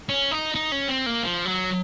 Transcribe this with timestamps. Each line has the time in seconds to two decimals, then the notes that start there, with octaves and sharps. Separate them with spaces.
0.09 C#4
0.31 D#4
0.55 D#4
0.72 C#4
0.88 C4
1.06 A#3
1.23 F3
1.45 F#3